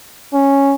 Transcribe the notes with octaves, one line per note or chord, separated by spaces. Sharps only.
C#4